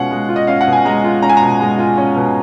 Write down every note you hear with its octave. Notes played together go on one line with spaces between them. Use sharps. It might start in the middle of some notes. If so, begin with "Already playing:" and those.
Already playing: B2 G#3 C#4 F4 F5 F#5
G#3
F4
D#5
C#4 F5
F#5
B2
G#5
G#3 A#5
F4
C#4 A#5
G#5
B2 A#5
G#3
F4
C#4
B2